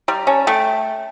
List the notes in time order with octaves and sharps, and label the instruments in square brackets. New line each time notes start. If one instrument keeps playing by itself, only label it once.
[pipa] G3 [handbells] A#5
[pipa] C#4 [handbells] A5
[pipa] A3 [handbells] G5